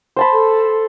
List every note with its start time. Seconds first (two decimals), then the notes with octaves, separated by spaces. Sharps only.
0.16 C5 A5 B5
0.33 A4